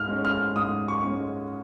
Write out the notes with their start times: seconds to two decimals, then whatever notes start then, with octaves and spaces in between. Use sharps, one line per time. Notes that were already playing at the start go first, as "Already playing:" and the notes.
Already playing: G#2 F6
0.09 G#3 C#4
0.25 F6
0.55 G#2 D#6
0.88 C#6
1.03 G#3 C#4